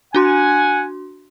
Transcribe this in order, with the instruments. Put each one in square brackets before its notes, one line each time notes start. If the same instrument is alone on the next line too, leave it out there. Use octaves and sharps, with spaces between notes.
[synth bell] D4 F#4 C6 [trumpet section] F#5 G#5